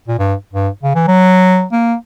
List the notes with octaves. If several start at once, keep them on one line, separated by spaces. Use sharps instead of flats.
A#2
G2
G2
C#3
E3
F#3
A#3